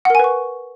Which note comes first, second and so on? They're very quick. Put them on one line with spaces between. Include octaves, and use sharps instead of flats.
F#5 A#4 G#5 B4 C#6